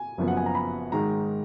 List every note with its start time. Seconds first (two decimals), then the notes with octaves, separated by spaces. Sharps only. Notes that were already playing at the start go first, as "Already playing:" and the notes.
Already playing: G#5
0.18 F#1 F#2 F3 B3
0.28 F#5
0.37 G#5
0.46 A#5
0.55 B5
0.92 G#2 D#3 G#3 A#5